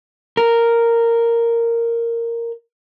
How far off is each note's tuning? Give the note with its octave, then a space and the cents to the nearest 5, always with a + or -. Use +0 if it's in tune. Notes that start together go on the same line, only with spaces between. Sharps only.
A#4 -10